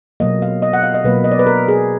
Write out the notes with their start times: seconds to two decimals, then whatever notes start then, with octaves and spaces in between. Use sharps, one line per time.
0.20 B2 F#3 A#3 D#5
0.42 F5
0.62 D#5
0.73 F#5
0.83 F5
0.94 D#5
1.04 B2 F#3 A#3 B4
1.24 D#5
1.32 D5
1.39 B4
1.47 A#4
1.68 G#4